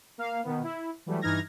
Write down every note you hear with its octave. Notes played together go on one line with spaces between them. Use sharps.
A#3 F5
B2 D#3 B3
E4
E3 F#3 G3 A3
G2 E3 D#4 F6 G#6 A#6